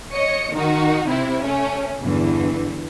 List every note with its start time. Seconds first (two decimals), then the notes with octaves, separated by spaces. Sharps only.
0.13 C#5 D#5 C#7
0.53 D#3 D#4 F#4
1.08 C3 C4 E4
1.42 A3 C#4
2.01 E2 G2 D3 E3